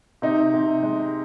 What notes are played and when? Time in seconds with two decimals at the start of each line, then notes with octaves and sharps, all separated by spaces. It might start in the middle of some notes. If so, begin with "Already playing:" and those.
0.22 C3 D#4
0.54 C3
0.83 G#3